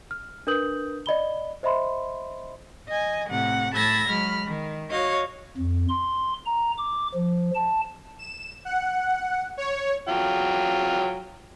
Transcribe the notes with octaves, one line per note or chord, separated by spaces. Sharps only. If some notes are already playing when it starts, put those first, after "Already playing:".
F6
D4 A#4 B4 D#6 G6 F#7
D5 D#5 B5 G7
C5 D#5 E5 B5 C6
D#5 G#5
A2 C3 F#5
A2 A5 B5 E6 G#6 A#6
F#3 G#3 B5 F6
D#3
F#4 C#5 D#5 F5
F2
C6
A#5
D6
F3
A5
E7
F#5
C#5
F#3 F4 G5